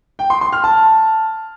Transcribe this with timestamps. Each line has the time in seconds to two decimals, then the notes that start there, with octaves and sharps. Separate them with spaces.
0.19 G5
0.30 C6
0.41 C6
0.53 F6
0.64 A5